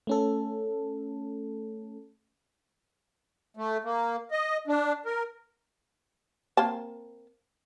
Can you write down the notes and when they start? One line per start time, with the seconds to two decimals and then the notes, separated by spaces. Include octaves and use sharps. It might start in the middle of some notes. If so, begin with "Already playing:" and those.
0.07 A3 C#4 A4
3.57 A3
3.84 A#3
4.31 D#5
4.67 D4
5.06 A#4
6.57 A#3 C4 A5